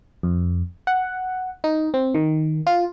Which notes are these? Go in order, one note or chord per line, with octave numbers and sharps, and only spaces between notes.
F2
F#5
D#4
C4
D#3
F4